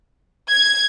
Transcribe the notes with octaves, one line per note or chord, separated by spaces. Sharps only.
G#6